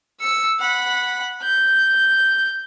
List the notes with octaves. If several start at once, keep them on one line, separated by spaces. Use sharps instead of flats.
E6 C#7
F#5 B5
G6